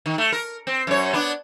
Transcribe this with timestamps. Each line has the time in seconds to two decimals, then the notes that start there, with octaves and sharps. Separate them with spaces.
0.06 D#3
0.18 A3
0.32 A#4
0.67 C4
0.87 F#2 C#5
1.13 B3 D4